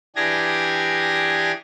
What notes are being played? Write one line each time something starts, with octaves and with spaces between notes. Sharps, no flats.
E3 D4 G4 G#4 G#6 A#6